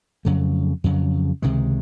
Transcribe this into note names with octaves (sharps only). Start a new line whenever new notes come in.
F2 C#3 F#3 A3
F2 C#3 F#3
C#2 C3 D#3 G#3